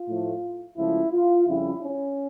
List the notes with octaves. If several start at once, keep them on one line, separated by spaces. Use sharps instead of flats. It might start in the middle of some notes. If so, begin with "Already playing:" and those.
Already playing: F4
A2 F3 A3
C#2 C#3 F3 A3 E4
F4
F2 C#3 G3 E4
C#4